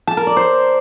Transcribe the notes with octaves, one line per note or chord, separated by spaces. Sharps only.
A5
A#4
D5
C5